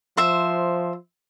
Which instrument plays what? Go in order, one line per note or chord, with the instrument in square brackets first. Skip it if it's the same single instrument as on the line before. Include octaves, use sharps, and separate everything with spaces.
[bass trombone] F3 [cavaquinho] C5 E5